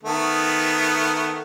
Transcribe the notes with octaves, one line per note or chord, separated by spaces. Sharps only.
D#3 A3 B3